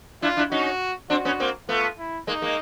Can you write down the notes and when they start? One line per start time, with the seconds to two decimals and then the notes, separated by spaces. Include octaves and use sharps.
0.22 D4 E4 F4
0.37 D4 E4
0.51 C#4 D#4 F#4
1.10 C4 D4 F#4
1.25 B3 C#4
1.40 A#3 C4
1.69 A3 B3 F4
1.98 E4
2.27 G#3 A#3 D#4
2.42 G#3 A#3